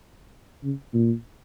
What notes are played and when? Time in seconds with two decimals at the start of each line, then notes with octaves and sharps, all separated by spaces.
0.64 C#3
0.94 A#2